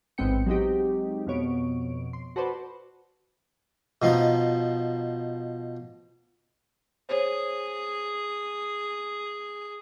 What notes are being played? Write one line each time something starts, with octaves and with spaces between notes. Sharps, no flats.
A1 G#2 B3 C4 G5 C#7
F#3 G#3 C4 D#4 G4
F2 B2 C#5 D7
C6
F#4 A4 B4 C5 D5
B2 F3 D#4 A#5
G#4 C5 C#5